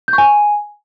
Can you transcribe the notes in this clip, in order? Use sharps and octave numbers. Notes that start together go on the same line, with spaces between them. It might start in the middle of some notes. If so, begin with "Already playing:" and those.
G6
C#6
G#5